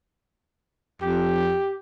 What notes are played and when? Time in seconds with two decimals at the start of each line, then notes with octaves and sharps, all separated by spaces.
1.02 F2 G4